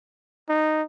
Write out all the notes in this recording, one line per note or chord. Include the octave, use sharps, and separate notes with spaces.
D#4